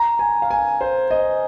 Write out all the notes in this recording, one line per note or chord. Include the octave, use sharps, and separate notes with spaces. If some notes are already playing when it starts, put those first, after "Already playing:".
Already playing: A#5
G#5
F5
G#5
C5
D#5